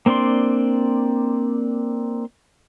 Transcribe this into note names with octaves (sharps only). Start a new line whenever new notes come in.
A#3 C4 D4 D5 C6